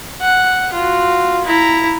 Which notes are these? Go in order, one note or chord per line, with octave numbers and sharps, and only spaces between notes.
F#5
F4 F#4
E4 A#5